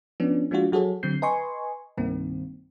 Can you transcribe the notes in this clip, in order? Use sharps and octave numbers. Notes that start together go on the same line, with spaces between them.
F3 B3 C#4 D4
F3 G#3 A#3 D4 F4 F#4
F#3 F#4 G#4 A4 C#5
D3 F#3 C4 G6 C7
B4 D#5 G#5 C6 C#6
C2 G2 D#3 A#3 C4